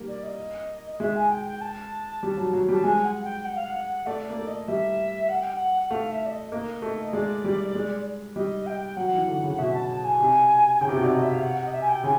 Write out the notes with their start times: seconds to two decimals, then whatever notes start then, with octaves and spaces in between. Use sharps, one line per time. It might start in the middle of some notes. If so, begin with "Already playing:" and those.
Already playing: G3 A#3
0.08 D5
0.23 D#5
0.91 D#5
1.00 G#3 E5
1.16 G#5
1.31 G5
1.46 G5
1.61 A5
2.23 G3
2.37 F#3
2.53 F#3
2.69 G3 A5
2.83 G#3 G#5
3.04 F#5
3.24 G5
3.45 F#5
3.55 F5
3.66 F#5
4.06 A3 D5
4.27 A#3 D5
4.38 A3
4.47 D#5
4.68 G3 E5
5.29 F#5
5.42 G5
5.54 F#5
5.81 F#5
5.90 A3 F5
6.11 E5
6.26 D5
6.31 D#5
6.52 A#3 D#5
6.82 A3
7.13 G#3 D5
7.44 G3
7.75 G#3
8.36 G3 D#5
8.66 G5
8.96 F#3 F#5
9.13 E3
9.28 D3
9.43 C#3
9.58 B2 E5
9.74 A5
9.90 A5
10.04 G#5
10.20 C3
10.76 G#5
10.81 C#3 G5
10.89 C3
10.96 B2
11.03 C3 D5
11.14 D#5
11.22 E5
11.33 F5
11.43 F#5
11.58 F#5
11.66 D#5
11.73 E5
11.81 G#5
11.88 G5
12.04 C#3 G#5